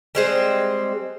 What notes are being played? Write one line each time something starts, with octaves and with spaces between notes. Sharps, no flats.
G3 G#3 C4